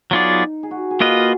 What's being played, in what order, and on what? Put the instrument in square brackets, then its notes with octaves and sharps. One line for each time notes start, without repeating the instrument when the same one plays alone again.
[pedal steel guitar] F#3 B3 F4 G#4 D5 [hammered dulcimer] D#4
[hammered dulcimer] G#4
F#4
G#4
[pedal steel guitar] A#3 F4 B4 D#5 [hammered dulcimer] F#4